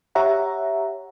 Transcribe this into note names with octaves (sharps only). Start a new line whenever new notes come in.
G4 C#5 E5 F#5 A#5